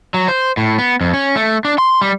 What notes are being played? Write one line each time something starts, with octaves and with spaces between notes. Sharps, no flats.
F#3
C5
A2
B3
F2
C#4
A3
D4
C6
G3